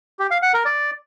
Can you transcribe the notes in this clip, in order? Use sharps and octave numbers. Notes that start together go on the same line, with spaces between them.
G4
F5
F#5
A#4
D5